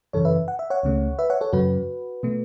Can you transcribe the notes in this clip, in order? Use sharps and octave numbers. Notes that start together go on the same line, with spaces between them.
F#2 C#3 E3 A4 C#5
B4 E5
F#5
E5
C#5 F#5
C#2 C#3 A3
B4 E5
C#5 F#5
A4 C#5
F#2 C#3 F#3 F#4 B4
B2 A3